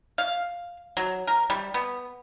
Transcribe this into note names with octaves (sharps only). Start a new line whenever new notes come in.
F5
F#3
A#4
G3
B3